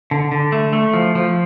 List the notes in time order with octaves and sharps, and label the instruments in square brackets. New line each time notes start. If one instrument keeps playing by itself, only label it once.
[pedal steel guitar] D3
D3
A3
A3
F3
F3